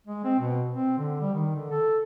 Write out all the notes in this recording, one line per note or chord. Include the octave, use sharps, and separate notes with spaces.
G#3
C4
B2
C4
D3
G3
D#3
D3
A4